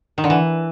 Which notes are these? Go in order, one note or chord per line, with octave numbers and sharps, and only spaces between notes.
D#3
D3
E3